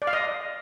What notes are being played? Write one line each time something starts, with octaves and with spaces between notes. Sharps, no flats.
D5
F5
D#5